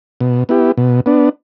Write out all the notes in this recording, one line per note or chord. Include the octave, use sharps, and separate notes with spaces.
B2
B3 E4 G4
B2
B3 D4